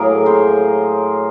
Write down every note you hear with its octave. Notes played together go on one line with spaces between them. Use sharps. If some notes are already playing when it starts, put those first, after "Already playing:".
Already playing: A2 F#3 A#3 G#4 A#4
A#4 C5